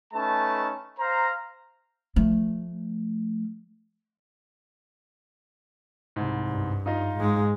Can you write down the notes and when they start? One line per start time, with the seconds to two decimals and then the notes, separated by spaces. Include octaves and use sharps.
0.14 A3 C#4 D#4 B4 A5
0.99 C5 F5 A#5
2.16 F3 A3
6.16 C2 G#2
6.49 G2
6.86 D#4 F4 D#5
7.16 G#2 G#3